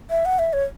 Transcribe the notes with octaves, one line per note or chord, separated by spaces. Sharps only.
E5
F#5
E5
C#5